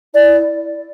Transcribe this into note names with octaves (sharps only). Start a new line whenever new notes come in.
E4 D5